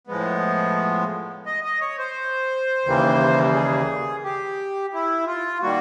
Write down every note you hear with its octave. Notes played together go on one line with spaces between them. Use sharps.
A2 F3 G#3 B3
D#5
D#5
C#5
C5
D#2 C#3 E3 G3 A#3
G#4
G4
E4
F4
D#3 G3 A#3 F#4